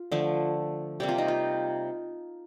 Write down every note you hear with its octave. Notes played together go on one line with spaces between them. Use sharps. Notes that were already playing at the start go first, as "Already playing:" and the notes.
Already playing: F4
D3 F3 A3
C3 G3 A#3 G4
F4
D#4
F4